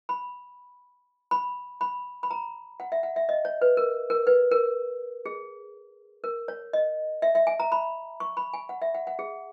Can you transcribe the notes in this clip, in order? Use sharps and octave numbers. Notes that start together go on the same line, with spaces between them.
B5
B5
B5
B5
A#5
F#5
E5
F#5
E5
D#5
C#5
B4
A#4
A#4
B4
A#4
G#4
A#4
C#5
D#5
E5
E5
G#5
A#5
B5
C#6
B5
G#5
F#5
E5
F#5
F#5
G#4